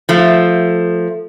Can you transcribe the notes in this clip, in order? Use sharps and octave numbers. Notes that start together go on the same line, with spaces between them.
F3 A3